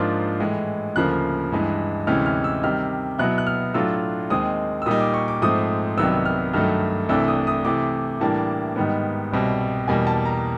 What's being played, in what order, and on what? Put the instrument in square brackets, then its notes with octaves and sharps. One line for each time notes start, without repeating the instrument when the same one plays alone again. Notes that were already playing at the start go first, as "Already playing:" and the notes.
Already playing: [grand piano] G#2 F3 A#3 D4 F4 C6
A2 E3 G#3
D2 C#3 F3 A#3 F#6
G2 E3 G#3
D2 C3 E3 G#3 C#4 F6
F6
E6
C3 D#3 G3 F6
B2 F#3 B3 E4 F#6
F#6
F6
A2 F#3 A3 D4 F4 E6
D#2 D#3 G#3 C4 D#6
E6
A#2 G3 A#3 D#4 D#6
D6
C#6
D6
G#2 F3 A3 C4 D#6
C2 C3 D#3 F#3 B3 E6
F6
G2 D#3 F#3 A3 F6
C2 C3 E3 A3 D4 E6
E6
D#6
D#6
C3 E3 A3 D6
A2 E3 G3 A#3 D4 A5
G#2 D#3 G3 B3
C2 B2 G3 C4
E2 B2 G3 A#3 G#5
A5
A#5